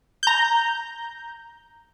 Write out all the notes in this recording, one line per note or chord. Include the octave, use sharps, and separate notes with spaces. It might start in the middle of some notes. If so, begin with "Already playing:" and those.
A#5 G6